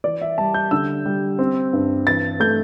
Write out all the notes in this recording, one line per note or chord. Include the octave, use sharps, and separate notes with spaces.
E3 D5
E5
G3 A5
G6
D3 E6
G3
C4
G2
E3 A6
A3 G6